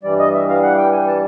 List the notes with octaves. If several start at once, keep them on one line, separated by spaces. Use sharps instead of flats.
G2 E3 G3 D5
D#5
E5
F5
F#5
G5
G#5
A5